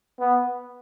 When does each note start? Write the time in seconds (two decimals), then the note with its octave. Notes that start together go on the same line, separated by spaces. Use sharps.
0.20 B3